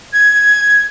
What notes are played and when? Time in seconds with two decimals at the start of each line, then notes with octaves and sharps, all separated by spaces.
0.13 G#6